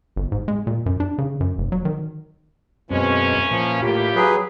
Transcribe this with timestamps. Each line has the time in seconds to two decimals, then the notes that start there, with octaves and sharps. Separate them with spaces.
0.16 G1
0.32 G#2
0.48 G#3
0.67 A#2
0.86 F#2
1.00 D4
1.18 C#3
1.40 F#2
1.58 F1
1.72 F#3
1.85 D#3
2.91 F#2 B2 E3 G#3 A#3 C4 C#4
3.51 A#2 F3
3.82 E2 A2 A#3 F4 G4 B5
4.15 F#3 G#4 B4